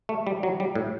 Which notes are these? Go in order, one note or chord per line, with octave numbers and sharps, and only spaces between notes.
A3
G3
F#3
G3
A2